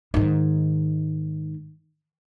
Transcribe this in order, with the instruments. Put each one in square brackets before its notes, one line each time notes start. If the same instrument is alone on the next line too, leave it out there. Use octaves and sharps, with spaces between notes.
[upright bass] G#2 D#3